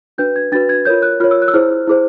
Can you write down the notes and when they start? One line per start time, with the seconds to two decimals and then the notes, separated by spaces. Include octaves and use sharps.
0.18 D4 F#4 B4 G6
0.36 G#6
0.52 D4 F#4 B4 A6
0.69 G#6
0.85 F4 A#4 C#5 G6
1.02 F#6
1.20 F4 A#4 C#5 F6
1.31 E6
1.42 F#6
1.48 E6
1.54 E4 G#4 C5 F6
1.87 E4 G#4 C5